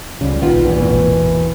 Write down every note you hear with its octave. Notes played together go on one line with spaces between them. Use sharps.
C#2 C#3 G3
A#1 D#3 B3 F4
E2 B2 E3
G#1 A#2